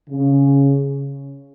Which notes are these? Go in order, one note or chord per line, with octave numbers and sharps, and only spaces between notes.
C#3